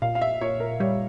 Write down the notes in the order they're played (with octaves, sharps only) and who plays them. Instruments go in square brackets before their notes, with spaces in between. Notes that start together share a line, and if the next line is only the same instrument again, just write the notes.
[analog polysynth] A#2 [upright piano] F5
[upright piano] F5
E5
[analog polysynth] A#2 [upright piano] C#5
[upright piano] A#4
[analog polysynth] G3 [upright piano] C#5